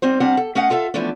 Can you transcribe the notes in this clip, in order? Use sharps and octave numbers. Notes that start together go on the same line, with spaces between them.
G3 C4 D#4 C5
G3 C4 D4 F5 F#5
A4
A3 C#4 D#5 F5 F#5
F4 A4 E5 F5
E3 F3 A3 B3 C#4 D4